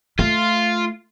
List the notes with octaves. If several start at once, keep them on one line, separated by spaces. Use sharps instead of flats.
A3 F4